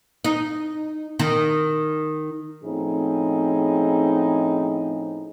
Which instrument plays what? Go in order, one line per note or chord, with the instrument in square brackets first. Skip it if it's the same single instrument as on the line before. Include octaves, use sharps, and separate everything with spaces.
[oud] D#4
D#3
[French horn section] A2 F3 C4 C#4 D#4 G#4